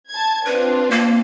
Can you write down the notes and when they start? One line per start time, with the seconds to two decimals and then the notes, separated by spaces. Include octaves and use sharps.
0.11 A5 G#6
0.46 C4 D4 F4 B4
0.91 A#3